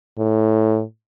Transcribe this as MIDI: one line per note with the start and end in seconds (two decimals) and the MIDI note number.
0.18 0.82 45